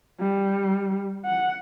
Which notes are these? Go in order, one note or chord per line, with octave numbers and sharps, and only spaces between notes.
G3
F#5